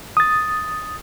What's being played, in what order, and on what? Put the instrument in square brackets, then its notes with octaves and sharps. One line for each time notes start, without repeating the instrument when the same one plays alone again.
[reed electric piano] D#6 A6